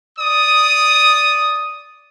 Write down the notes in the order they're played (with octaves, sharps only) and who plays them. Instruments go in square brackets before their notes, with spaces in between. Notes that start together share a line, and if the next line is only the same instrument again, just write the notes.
[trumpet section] D5 D#6